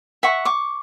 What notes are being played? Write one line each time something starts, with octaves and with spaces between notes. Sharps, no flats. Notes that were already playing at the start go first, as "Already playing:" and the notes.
E5 F#5 C#6
C#6 D6